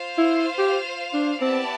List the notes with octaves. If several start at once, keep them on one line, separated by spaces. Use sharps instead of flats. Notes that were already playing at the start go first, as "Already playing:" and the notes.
Already playing: F4 C5 F5
E4
G4
D4
B3 C4 E4 G4 D5 A5